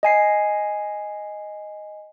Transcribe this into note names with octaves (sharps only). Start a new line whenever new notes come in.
D#5 G#5 C7